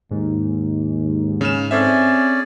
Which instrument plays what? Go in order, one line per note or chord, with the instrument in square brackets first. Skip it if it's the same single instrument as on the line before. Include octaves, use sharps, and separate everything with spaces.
[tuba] D#2 [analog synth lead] G#2
[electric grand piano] C#3 E7 [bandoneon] F6
[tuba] C4 [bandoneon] C#4 G#4 D5 [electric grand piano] A4 C5 E5